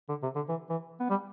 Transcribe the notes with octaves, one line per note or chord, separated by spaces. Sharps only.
D3
C3
D3
E3
E3
B3
G3